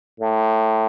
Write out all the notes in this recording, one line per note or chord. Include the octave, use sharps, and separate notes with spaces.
A2